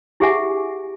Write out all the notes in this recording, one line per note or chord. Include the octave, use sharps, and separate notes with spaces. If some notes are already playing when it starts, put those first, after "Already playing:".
E4 G4 G#4 E5 F#5 G#5